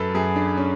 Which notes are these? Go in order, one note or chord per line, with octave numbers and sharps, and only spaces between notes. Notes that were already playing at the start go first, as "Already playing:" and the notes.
Already playing: F#2 A4 B4
F#2 G#4
D4
C#4